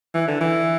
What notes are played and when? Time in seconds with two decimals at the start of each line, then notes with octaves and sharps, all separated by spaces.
0.15 E3
0.28 D3
0.41 E3